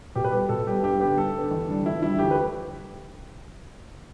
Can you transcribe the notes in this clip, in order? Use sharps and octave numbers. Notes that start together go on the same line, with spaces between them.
B2 G4
B4
G3 B3 G4
B2 A4
G3 B3 G4
G2 G4
D3 B3 G4
G2 A4
D3 B3
E2
D3 G3 D4
E2 E4
D3 G3 D4 E4
D2 G4
B4